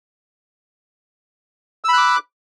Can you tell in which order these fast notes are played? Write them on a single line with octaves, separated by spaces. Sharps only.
E6 B5 F#6 D6